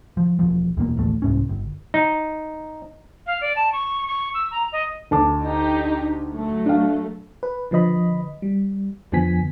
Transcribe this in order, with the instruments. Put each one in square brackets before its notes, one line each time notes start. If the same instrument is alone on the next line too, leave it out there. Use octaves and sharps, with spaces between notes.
[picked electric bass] F3
E1 F3
E2 B2 A#3
A1 D#2 A3
C2 G#2 C#4
G1
[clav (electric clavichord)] D#4
[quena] F5
D5
A5
C#6
C#6
E6
A#5
D#5
[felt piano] D2 A5 D6
[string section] D#4 G4
F#3 A3
[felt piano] D4 F5
[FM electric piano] B4
D3 F3 B4 D#5 B5
G3
F2 D3 F3 B3 G#5 B6